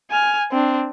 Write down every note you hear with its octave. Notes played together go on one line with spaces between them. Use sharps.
G#5 F6
C4 D4